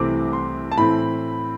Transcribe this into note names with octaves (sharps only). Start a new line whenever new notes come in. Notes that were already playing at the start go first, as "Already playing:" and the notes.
Already playing: C2 C3 E3 A3 C4 D6
C6
A5
A2 E3 A3 C4 B5